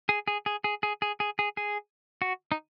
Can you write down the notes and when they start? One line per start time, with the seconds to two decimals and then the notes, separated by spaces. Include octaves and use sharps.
0.09 G#4
0.28 G#4
0.46 G#4
0.64 G#4
0.83 G#4
1.02 G#4
1.20 G#4
1.39 G#4
1.57 G#4
2.22 F#4
2.52 D#4